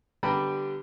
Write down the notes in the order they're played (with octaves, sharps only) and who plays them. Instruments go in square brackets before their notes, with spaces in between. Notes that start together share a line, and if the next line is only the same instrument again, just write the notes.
[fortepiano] D3 G3 B3 G4 A#5 B5